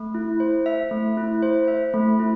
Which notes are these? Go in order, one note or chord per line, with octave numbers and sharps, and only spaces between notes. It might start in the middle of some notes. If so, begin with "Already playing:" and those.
Already playing: A3
E4
C5
E5
A3
E4
C5
E5
A3
E4